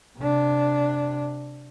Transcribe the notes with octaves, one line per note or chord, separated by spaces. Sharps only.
C3 D4